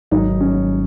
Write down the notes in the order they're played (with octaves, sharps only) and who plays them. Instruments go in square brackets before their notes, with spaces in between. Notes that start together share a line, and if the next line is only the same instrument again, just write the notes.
[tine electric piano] G#1 G#2 D#3 F#3 [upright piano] D#4
[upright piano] C#4